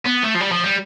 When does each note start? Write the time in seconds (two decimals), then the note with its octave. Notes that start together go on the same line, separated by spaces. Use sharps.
0.06 B3
0.24 A3
0.35 F3
0.41 G3
0.52 F3
0.64 G3